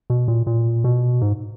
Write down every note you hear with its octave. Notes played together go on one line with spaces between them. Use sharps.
B2
A#2
A#2
B2
G#2